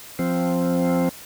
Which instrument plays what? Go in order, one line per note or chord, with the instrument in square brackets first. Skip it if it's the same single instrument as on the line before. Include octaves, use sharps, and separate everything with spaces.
[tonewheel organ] F3 C4